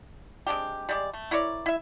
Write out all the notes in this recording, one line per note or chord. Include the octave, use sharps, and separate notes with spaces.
G#3 C4 D4 G4
G3 G#3 D5
A3
E4 A#4 C#5 D5
E4 E5